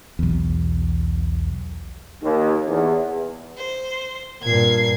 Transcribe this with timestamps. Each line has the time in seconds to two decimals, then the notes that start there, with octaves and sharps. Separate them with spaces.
0.19 B1 E2
2.21 D#2
2.67 E2
3.57 C5
4.42 G2 A#2 G#6 C7